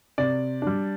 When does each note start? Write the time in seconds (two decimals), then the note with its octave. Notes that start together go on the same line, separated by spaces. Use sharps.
0.18 C3 D5
0.62 G3 D4